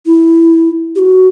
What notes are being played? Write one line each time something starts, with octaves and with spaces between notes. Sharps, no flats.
E4
G4
F#4